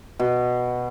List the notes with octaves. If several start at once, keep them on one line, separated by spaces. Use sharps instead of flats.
B2